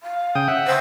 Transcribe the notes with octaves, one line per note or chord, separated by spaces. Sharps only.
F5
C#3 G5 D#6
E5 F#5
C5